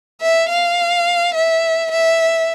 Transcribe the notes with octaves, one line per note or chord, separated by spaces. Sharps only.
E5
F5
E5
E5